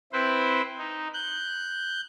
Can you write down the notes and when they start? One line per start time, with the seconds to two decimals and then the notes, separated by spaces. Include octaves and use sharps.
0.12 C4 E4 B4 C5
0.78 D#4
1.14 F#6 G6